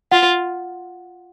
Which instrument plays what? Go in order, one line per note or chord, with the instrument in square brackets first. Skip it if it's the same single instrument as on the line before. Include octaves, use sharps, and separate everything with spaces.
[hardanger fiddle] F4 [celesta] F#5